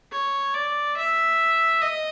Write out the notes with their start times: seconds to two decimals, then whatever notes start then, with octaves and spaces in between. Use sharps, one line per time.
0.12 C#5
0.54 D5
0.97 E5
1.81 D#5